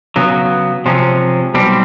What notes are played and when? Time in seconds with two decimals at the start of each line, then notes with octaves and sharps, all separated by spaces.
0.16 C#3 F#3 B3
0.86 C3 F3 G#3 C#4
1.54 B1 B2 G3 C4